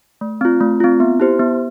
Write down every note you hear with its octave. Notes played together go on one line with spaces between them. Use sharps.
A3
C4 F4
A3
C4 F4
B3
E4 G4 C5
B3